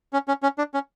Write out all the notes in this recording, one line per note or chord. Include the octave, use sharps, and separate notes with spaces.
C#4
C#4
C#4
D4
C#4